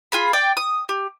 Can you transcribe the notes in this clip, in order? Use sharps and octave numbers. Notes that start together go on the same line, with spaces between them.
F4 G#4 B5
D5 G5 D6
D#6
G4